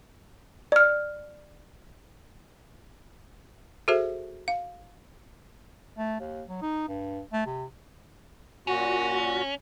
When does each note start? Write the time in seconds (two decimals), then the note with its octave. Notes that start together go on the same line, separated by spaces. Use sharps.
0.72 D5 F6
3.88 F#4 G#4 A4 C5 E5
4.48 F5
5.98 A3
6.20 D#2
6.48 F#3
6.62 D#4
6.88 G2
7.33 A3
7.47 C3
8.67 A#2 C#4 F#4